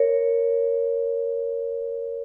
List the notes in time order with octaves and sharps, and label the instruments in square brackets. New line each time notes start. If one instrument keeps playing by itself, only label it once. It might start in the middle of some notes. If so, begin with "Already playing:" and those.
Already playing: [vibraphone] A#4 C#5